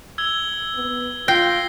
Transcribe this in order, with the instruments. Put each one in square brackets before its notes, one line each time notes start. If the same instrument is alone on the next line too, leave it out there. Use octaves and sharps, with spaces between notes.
[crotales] E6 G#6 G7
[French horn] B3
[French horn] F4 [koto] G5 [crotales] A#6 C7 G7